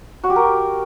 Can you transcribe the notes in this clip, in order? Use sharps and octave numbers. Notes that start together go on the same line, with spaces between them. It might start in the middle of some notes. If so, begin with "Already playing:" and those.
F#4
G4
A#4